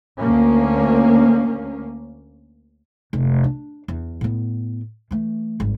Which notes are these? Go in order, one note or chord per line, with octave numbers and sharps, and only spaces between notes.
D2 A#3 C#4
F1
D4
E2
A2 B3
E3 A3
G#1 G2